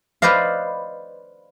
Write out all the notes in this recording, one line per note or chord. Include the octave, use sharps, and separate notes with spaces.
B4 C5 D5 D#5 F5